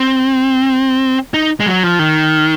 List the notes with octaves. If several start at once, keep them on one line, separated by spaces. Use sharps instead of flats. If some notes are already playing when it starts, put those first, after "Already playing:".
Already playing: C4
D#4
G#3
F#3
F3
D#3